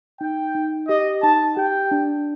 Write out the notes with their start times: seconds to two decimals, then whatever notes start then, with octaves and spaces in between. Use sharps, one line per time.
0.20 D#4 G5
0.55 D#4
0.88 G4 D#5
1.23 D#4 A5
1.57 G4 G5
1.91 D4